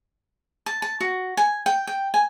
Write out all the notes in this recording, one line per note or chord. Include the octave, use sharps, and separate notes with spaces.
A5
A5
F#4
G#5
G5
G5
G#5